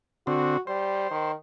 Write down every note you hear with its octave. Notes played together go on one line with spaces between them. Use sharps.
D3 C4 F#4
G3 C5
D#3